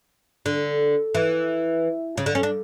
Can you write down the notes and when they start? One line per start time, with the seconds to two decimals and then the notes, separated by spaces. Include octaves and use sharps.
0.46 D3
1.14 E3
2.17 C#3
2.26 D3
2.35 C#4
2.43 D4